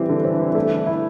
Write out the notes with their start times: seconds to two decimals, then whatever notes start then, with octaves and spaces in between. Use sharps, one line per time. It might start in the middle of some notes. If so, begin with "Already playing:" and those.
Already playing: E3 G3 C4 G4
0.09 D3
0.24 C4
0.40 G3
0.55 A3
0.71 D3
0.86 E4